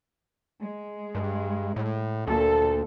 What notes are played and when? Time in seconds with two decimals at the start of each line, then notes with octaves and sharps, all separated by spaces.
0.60 G#3
1.15 G2
1.76 A2
2.27 D2 A#2 A4